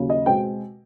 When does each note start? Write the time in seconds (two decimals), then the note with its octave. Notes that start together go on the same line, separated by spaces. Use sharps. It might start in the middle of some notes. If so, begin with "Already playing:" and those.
Already playing: D#2 C#3 F#3
0.10 D#5
0.26 B2 G#3 C4 G5